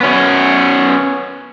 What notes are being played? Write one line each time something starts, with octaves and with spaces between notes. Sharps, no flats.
B3 C#4 F#4